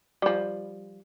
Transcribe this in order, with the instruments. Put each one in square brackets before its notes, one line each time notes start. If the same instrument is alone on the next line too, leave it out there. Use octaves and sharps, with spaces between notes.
[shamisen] F3 G3